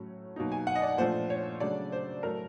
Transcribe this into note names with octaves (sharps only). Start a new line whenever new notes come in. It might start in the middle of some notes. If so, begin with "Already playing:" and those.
Already playing: A2 F#3 A3 C#4
B2 F#3 A#3 D#4
G#5
F#5
D#5
D5
A#2 F3 A3 D4 F4 C5
C#5
C#3 F#3 A3 D4 D5
C5
A2 F#3 A3 A#4